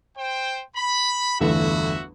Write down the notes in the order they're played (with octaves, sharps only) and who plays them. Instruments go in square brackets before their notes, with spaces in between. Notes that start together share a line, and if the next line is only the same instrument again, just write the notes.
[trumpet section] C5 G5
B5
[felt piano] G1 E2 A3 [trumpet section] F#4 E5